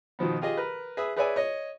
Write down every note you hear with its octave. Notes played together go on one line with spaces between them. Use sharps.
B2 D#3 F3 B3
F4 G4 G#4 D#5
A#4 B4
G#4 B4 E5
G#4 B4 C#5 D5 E5 G#5
C#5 D#5